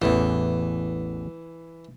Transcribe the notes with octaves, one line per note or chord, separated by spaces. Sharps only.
A1 E2 E3